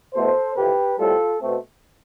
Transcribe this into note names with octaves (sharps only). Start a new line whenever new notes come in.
E2 B2 A3 A4 C5
F2 C3 E3 G4 B4
A2 G3 C4 F4 A4
B2 A3 C4